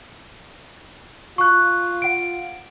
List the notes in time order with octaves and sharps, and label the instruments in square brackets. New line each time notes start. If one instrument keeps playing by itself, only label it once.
[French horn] F4 [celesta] C#6 F#6
[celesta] F#5 D7